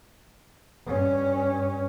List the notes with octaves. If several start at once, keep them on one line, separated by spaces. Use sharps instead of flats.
G2 C#4